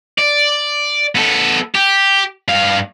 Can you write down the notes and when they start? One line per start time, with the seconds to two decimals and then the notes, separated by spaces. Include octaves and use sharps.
0.18 D5
1.15 B3 A4
1.75 G4
2.48 G2 F5